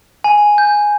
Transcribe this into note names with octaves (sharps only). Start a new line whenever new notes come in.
G#5
G6